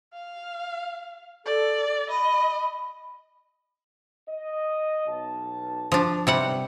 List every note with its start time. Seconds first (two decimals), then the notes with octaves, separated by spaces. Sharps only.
0.13 F5
1.46 A4 D5
2.10 D#5 B5
4.28 D#5
5.07 B1 A5
5.92 F3 D4
6.27 B1 C3 G3 F#5